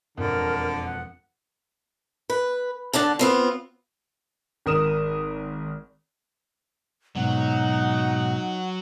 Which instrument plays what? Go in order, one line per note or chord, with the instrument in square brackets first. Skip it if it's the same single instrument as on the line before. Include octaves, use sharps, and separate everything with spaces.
[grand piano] E1 F2 [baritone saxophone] D3 [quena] A#4
[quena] F#5
[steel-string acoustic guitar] B4
D3 D4 F#5 A5
B3 C4 F4
[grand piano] G#1 A#4 D#6 E7
[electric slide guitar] G#2 B2 [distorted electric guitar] F#3 [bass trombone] D#4 [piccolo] F#5